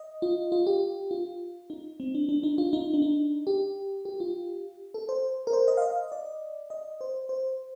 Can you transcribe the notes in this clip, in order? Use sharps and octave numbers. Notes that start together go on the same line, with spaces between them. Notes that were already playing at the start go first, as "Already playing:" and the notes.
Already playing: D#5
F4
F4
G4
F4
D#4
C4
D4
D4
D#4
F4
D#4
D4
D#4
G4
G4
F4
A4
C5
A#4
C5
D#5
F5
D#5
D5
D#5
C5
C5